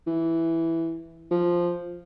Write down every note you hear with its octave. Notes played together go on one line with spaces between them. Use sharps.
E3
F3